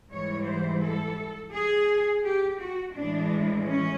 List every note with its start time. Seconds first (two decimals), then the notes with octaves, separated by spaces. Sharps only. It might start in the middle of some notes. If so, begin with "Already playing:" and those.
0.10 G#2 E3 G3 C#5
0.46 C5
0.81 A4
1.53 G#4
2.24 G4
2.59 F#4
2.94 A2 E3 G#3 D4
3.65 C#4